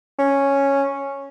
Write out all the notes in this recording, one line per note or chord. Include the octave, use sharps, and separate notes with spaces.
C#4